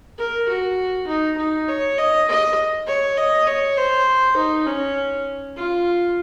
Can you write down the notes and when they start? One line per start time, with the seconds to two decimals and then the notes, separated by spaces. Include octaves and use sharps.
0.18 A#4
0.48 F#4
1.08 D#4
1.38 D#4
1.68 C#5
1.98 D#5
2.28 D#5
2.87 C#5
3.17 D#5
3.47 C#5
3.77 C5
4.37 D#4
4.67 C#4
5.57 F4